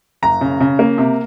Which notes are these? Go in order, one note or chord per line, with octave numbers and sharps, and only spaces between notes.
F#1 A#5
C#3
C#3
A#3
C3